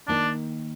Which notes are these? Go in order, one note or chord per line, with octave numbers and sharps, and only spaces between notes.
D#3 A#3 D4 D#4